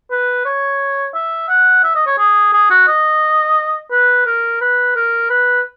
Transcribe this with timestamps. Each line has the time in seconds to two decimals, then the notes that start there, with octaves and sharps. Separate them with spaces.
0.11 B4
0.46 C#5
1.14 E5
1.49 F#5
1.84 E5
1.95 D#5
2.07 C#5
2.18 G#4
2.53 G#4
2.70 F#4
2.88 D#5
3.92 B4
4.26 A#4
4.61 B4
4.96 A#4
5.30 B4